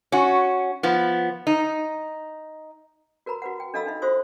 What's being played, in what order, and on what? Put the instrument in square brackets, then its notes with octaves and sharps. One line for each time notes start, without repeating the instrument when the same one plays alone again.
[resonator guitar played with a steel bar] C#4 F#4
F3 B3
D#4
[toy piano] F#4 A#4 B4 A#5 B5
F#4 B4 F#5
G5
D4 A4 D#5 F5 B5 E6
D4 D#4 E5
F4 F#4 C5 C6 D#6 E6